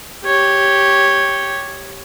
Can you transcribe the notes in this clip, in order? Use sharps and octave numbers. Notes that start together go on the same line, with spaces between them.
G4 C#5